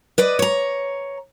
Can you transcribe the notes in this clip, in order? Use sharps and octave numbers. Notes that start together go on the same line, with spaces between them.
B4 D5 D#5
C#5 A#5